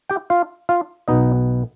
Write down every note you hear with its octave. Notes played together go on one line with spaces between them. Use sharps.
G4 G5
F4 F5
F4 F5
B1 B2 B3 D#4 D#5